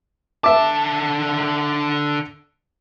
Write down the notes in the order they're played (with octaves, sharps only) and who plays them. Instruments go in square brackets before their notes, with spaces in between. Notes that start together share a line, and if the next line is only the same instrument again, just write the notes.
[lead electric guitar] D3 A5 [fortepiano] E5 D6